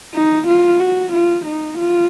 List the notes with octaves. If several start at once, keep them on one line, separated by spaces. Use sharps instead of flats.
D#4
F4
F#4
F4
D#4
F4